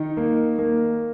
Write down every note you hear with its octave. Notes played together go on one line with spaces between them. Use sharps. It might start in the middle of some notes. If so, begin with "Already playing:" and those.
Already playing: D#3 D#4
A#3
A#3